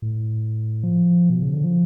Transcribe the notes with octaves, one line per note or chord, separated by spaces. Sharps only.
A2
F3
B2
C#3
D3
F3